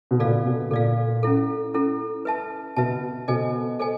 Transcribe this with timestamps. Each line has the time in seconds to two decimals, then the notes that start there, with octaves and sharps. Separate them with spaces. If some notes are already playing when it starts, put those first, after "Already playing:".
0.11 B2
0.20 A#2 A4 D5 F5
0.46 B2
0.71 A#2 A4 D5 F5
1.23 C#4 E4 A4
1.74 C#4 E4 A4
2.25 B4 E5 A5
2.76 B2 B4 E5 A5
3.28 B2 A4 C5 D#5 G#5
3.79 A4 C5 D#5 G#5